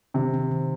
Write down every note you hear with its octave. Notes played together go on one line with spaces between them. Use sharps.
C3 D#3
C4
D#3